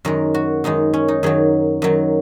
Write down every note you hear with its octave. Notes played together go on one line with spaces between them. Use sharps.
F#2 D#3 G#3 A#4
F#4
F#2 D#3 G#3 D#4
C#4
D#4
F#2 D#3 F#3 G#4
F#2 D#3 F#3